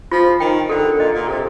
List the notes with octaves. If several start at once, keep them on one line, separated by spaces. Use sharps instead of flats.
F3 F4
D#3 G5
D3 A4
A#2 D#5
A#2
C3 A4